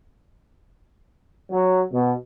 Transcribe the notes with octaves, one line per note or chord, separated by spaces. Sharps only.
F#3
B2